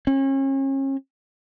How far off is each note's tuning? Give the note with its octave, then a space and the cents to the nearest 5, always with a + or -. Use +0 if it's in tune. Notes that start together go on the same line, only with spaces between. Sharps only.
C#4 -35